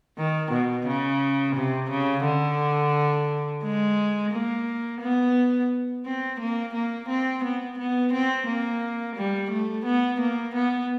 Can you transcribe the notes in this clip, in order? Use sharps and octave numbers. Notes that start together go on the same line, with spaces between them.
D#3
B2
C#3
C3
C#3
D3
G#3
A#3
B3
C4
A#3
A#3
C4
B3
B3
C4
A#3
G3
A3
B3
A#3
B3